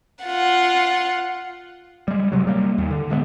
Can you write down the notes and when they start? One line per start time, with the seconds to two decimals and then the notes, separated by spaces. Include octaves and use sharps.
0.24 F4 F#5
2.08 G3 G#3
2.32 F#1 D#2 C3 F#3
2.47 G3 A#3
2.78 D#2
2.91 D3
3.10 D1 G#3 A3 B3